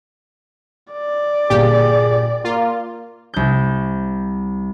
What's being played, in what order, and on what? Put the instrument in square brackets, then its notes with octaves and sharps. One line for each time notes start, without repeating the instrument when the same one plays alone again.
[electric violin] D5
[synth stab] G1 A#2 G4 [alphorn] G#4
[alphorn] A#3 [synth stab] F4
[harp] C2 G6